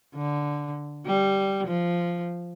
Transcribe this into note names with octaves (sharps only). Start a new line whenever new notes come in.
D3
G3
F3